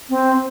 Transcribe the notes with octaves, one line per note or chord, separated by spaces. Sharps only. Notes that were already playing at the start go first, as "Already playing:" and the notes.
C4